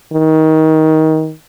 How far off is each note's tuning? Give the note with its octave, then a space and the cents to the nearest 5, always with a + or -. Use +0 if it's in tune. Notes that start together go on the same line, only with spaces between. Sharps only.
D#3 +20